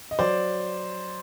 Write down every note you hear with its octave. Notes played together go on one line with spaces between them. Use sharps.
D#5
F#3 C5 D5